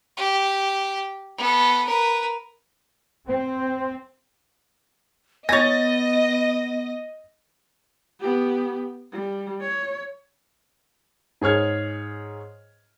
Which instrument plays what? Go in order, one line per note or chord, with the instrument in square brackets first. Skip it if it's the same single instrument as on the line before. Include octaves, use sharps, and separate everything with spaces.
[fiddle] G4
B3 A4
A#4 B4
[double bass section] C4
[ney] B3 [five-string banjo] C#5 G#5 [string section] D#5 [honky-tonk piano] A6 A#6
[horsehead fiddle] B3 G4
G3
C#5
[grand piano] G#2 G#4 C#5 F6 G#6